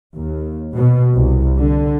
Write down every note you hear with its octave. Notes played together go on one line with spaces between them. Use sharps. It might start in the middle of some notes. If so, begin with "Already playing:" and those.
D#2
B2
C2
D3